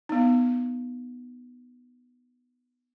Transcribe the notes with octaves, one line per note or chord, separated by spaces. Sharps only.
B3 D#4